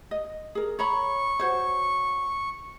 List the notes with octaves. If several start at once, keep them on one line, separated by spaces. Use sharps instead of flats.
D#5
G#4 A#4
C#5 A#5 B5 C#6
F#4 C5 C#5